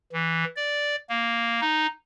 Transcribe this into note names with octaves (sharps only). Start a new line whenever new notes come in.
E3
D5
A#3
D#4